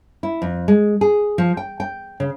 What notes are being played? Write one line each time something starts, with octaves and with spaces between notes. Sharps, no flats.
E4
F2
G#3
G#4
F3
G5
G5
C#3